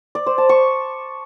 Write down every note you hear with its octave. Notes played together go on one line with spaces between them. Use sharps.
D5
C5
A5
C#6